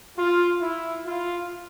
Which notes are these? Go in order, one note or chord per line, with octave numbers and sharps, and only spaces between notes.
F4
E4
F4